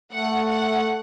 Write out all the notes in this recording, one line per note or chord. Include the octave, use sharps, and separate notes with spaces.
A3 F#5
F#5